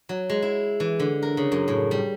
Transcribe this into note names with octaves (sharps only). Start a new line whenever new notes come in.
F#3
G#3
E4
E3
D3
A#4
C#3
F#2
A2
G3